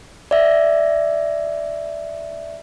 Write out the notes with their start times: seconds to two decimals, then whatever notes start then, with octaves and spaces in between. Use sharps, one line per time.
0.31 D5 E5